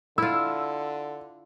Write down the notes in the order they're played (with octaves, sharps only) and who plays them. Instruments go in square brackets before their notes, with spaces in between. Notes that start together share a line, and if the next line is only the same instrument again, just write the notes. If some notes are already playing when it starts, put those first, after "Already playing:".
[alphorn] D3 [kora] E4 F4 [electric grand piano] E6